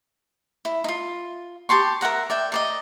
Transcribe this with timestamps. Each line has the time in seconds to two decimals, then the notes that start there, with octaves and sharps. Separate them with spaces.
0.65 E4
0.84 D#4 F4
1.69 G4 A5 C6 C#6
2.01 A#4 E5 F#5 A#5
2.30 D5 E5 G5
2.52 A#4 D5 D#5